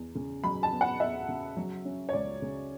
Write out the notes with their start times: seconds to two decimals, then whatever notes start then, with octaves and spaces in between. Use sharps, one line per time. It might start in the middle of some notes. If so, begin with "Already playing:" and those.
Already playing: E2
0.15 C#3
0.44 F#3 B5
0.63 A5
0.72 B3
0.81 F#5
1.00 E2 E5
1.28 C#3
1.57 F#3
1.85 C#4
2.09 C#5
2.13 C#2 D5
2.42 C#3